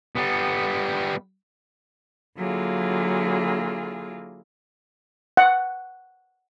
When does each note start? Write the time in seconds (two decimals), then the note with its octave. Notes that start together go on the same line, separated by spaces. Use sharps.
0.15 G3 B3
2.37 D3 F#3 A#3 E4 F4 G#4
5.37 F#5